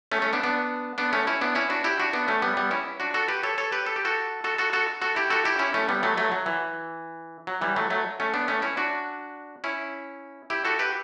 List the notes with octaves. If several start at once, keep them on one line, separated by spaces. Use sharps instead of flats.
A3 C#4
A3 C#4
B3 D4
B3 D4
B3 D4
A3 C#4
C#4 E4
B3 D4
C#4 E4
D4 F#4
E4 G4
D4 F#4
B3 D4
A3 C#4
G3 B3
G3 B3
C#4 E4
D4 F#4
F#4 A4
G4 B4
A4 C#5
A4 C#5
G4 B4
A4
G4
F#4 A4
F#4 A4
F#4 A4
F#4 A4
F#4 A4
E4 G4
F#4 A4
E4 G4
C#4 E4
A3 C#4
G3 B3
F#3 A3
F#3 A3
F#3
E3
F#3
E3 G3
F#3 A3
F#3 A3
A3 C#4
B3 D4
A3 C#4
C#4 E4
D4 F#4
C#4 E4
E4 G4
F#4 A4
G4 B4